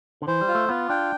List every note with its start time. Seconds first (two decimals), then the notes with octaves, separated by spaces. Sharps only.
0.22 D3
0.27 E3 C5
0.41 G3
0.48 F4
0.55 A3
0.69 B3 F4
0.90 D4 G5